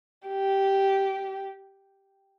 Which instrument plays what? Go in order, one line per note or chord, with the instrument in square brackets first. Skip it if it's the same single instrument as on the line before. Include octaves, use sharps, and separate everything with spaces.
[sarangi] G4